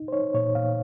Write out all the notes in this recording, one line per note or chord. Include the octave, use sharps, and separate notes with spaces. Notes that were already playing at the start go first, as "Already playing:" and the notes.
Already playing: D#4
C5
D#4 C#5
A#2 C#5
A#2 F5